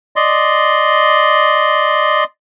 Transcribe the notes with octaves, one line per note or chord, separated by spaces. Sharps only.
D5 D#5 C6